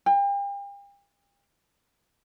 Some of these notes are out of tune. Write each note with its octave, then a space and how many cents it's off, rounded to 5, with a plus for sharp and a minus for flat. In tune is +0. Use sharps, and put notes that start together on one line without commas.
G5 +40